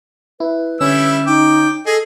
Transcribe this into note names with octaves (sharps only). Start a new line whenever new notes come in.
E4 B4
D3 G3 C#4 E4 E6
D#4 G5 D6
G#4 A4 D#5